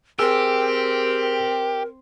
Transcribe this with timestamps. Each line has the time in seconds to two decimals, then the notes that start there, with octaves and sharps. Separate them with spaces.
0.19 C4 G4 G#4 A#4 E6